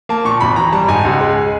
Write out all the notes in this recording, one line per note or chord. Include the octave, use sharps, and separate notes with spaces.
A#3 A5
A#2 C#6
G#1 B5
E3 A#5
G3 A5
G#2 G#5
C#2
G#3